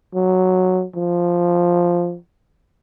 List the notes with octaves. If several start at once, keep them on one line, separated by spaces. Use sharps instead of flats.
F#3
F3